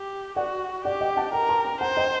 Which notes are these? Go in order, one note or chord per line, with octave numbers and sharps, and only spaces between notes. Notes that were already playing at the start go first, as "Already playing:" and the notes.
Already playing: G4
F#4 D5 F#5
G4 D5 F#5
D#5 G5
F#5 A5
A#4 G5 A#5
A5 C6
G5 A#5
C5 F#5 A5
D#5 G5